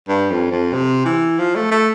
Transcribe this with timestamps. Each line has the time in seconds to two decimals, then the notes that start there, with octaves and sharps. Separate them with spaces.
0.08 G2
0.30 F2
0.51 F2
0.74 C3
1.05 E3
1.39 F3
1.55 A3
1.71 A3